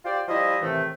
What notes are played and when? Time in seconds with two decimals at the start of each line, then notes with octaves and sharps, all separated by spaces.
0.04 F4 G4 C5 D5
0.28 F3 G3 E4 D#5
0.61 A2 C3 D#3 E3 A3